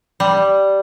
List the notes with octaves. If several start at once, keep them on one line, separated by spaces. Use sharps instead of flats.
G3